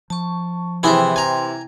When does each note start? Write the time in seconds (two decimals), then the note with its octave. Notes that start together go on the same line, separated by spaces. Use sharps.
0.10 F3 A5 C#6
0.83 C3 E3 E4 G#4 C5 G5 C6
1.16 G#5 A#5